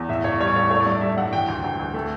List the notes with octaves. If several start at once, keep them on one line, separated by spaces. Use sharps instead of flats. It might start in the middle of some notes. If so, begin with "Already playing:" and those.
Already playing: E2
A2 E5
A2 C#5
D5
G3 C#5
D5
A2 C#5
A3 C#5
D5
G2
D5
G2 E5
G2 F#5
E3 G5
D2
D2
D2
A3